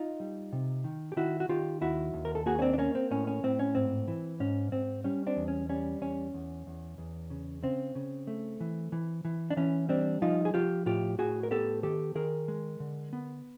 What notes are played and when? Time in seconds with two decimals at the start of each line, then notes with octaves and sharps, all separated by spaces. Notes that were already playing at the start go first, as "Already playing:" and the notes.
Already playing: D#4 F4
0.20 G3
0.53 C3
0.84 D#3
1.12 G4
1.17 D#3 E4 F#4
1.40 F#4
1.49 D#3 F4 G4
1.81 D#2 E4 F#4
2.14 D#2
2.25 A#4
2.35 A4
2.46 A#3 F#4 G#4
2.59 C#4
2.62 C4 D4
2.73 D4
2.78 A#3 C#4
2.95 C4
3.11 A2 C#4
3.27 C#4
3.43 A2 C4
3.59 C#4
3.75 G#2 C4
4.08 E3
4.40 G#2 C#4
4.72 G#2 C4
5.04 G3 C#4
5.26 C4 D4
5.37 E2
5.48 C#4
5.69 G3 C#4
6.02 E2 C#4
6.34 E2
6.67 E2
6.98 E2
7.30 C#3
7.63 C#3 C4
7.95 C#3
8.27 A3
8.60 E3
8.92 E3
9.25 E3
9.50 D4
9.57 E3 C#4
9.89 G3 C4 D4
10.22 F3 D#4 F4
10.45 G#4
10.54 F3 F4 G4
10.86 A2 F4 G4
11.19 A2 F#4 G#4
11.43 A#4
11.51 B3 G4 A4
11.83 D#3 G4 A4
12.15 D#3 G#4 A#4
12.48 G#3
12.80 D3
13.13 B3